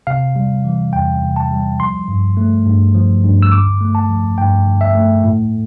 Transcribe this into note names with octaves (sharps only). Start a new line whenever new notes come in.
C3 F5
G3
E3
E2 G5
C3
A5
G3
F3 C6
G2
A3
G2
F3
G2
E6
D3 D6
A3
A5
F3
G2 G5
D3
E5
A3
A2